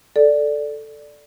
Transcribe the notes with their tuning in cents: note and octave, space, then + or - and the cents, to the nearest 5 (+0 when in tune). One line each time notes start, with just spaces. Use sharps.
A4 +0 D5 +0